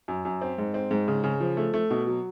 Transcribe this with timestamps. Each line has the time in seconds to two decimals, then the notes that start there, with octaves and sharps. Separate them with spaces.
0.08 F#2
0.25 F#2
0.42 C4
0.58 G#2
0.74 C4
0.91 G#2
1.08 C#3
1.24 C#3
1.40 F3
1.57 A3
1.74 A3
1.90 B2
2.07 F#3